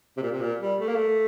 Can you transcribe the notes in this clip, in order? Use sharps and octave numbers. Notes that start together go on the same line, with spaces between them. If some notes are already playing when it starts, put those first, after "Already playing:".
C3
A#2
C3
A#2
G3
A3
A#3
A3